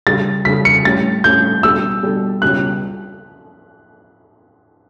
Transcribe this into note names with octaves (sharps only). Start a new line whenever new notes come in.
C#3 G3 D4 A4 A6
C#3 G3 D4 A4 B6
C#7
A2 G3 C#4 A6
A2 G3 C#4 G6
B2 G3 D4 A4 E6
B2 G3 D4 A4
C#2 B2 G3 C#4 F#6